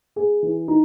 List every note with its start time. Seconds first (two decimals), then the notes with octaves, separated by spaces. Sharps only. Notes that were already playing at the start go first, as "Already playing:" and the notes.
0.16 G#4
0.43 E3
0.68 D#4